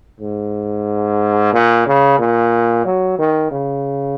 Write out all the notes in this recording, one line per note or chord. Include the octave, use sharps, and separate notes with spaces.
G#2
A#2
C#3
A#2
F#3
D#3
C#3